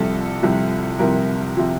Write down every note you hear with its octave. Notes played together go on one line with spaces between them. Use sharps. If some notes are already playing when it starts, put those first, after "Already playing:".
Already playing: C2 C3 F3 A4
C2 C3 F3
C2 C3 F3 A#4
C3 F3